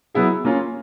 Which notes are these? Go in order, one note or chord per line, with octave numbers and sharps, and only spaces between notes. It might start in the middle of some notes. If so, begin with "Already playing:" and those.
F#3 B3 E4 G#4
A#3 C#4 F4